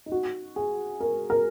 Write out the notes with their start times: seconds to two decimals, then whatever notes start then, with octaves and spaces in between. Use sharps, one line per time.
0.06 D#4
0.12 F#4
0.56 G#4
1.00 A#4
1.30 A#4